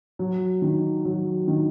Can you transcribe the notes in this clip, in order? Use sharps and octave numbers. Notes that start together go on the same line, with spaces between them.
F#3
D#3
F#3
D#3